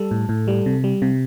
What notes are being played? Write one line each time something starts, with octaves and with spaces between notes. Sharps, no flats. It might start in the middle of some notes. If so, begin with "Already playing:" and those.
Already playing: G3 A4
A2
A2
G3
C3
G3
C3